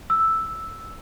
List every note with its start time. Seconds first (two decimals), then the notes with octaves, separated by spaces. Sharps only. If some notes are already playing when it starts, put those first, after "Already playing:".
0.10 E6